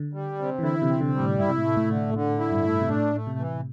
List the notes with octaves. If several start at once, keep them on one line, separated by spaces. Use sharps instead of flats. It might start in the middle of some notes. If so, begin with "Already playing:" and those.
Already playing: D3
G3
C3
E3
D3 E4
C3
C4
D3
G3
A2
G2 E4
C3
A2
A3
A2
D3
A2 D3
E4
G2
A3
C3
A2 D4
A3
C3
E3